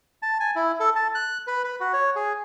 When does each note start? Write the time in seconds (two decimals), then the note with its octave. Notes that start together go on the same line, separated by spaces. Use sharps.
0.22 A5
0.40 G#5
0.56 E4
0.80 A4
0.96 A5
1.15 F#6
1.47 B4
1.64 B4
1.80 F#4
1.93 C#5
2.16 G#4